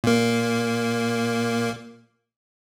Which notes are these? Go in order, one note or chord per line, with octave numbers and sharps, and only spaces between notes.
A#2 A#3